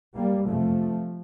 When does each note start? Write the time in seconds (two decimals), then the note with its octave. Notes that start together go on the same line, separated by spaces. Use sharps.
0.17 G3 A#3
0.49 F2 C3 F3 A3